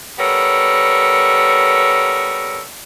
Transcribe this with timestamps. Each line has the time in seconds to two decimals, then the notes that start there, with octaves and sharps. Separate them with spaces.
0.19 G3 B3 A4 A#4 C#5